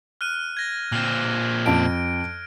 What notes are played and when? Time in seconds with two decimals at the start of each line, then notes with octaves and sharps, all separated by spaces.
0.21 F6 F#6 D#7
0.57 G#6 A#6
0.92 A#2 C4 F6
1.66 F2 A5 D7